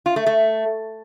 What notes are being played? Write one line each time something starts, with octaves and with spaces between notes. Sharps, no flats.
F4
A3
A3